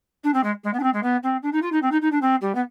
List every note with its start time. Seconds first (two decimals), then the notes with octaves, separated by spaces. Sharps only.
0.24 D4
0.34 C4
0.43 G#3
0.63 G#3
0.73 B3
0.79 D4
0.83 C4
0.93 G#3
1.03 B3
1.23 C4
1.42 D4
1.52 D#4
1.62 F4
1.72 D#4
1.82 C4
1.91 D#4
2.01 D#4
2.11 D4
2.21 C4
2.41 G3
2.55 B3